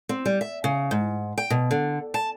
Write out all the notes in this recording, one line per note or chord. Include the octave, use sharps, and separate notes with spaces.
C4
G3
E5
C#3
G#2
G5
B2
D3
A5